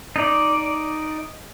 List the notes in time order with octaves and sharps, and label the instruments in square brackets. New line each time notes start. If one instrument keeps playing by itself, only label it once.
[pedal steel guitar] D#4 D5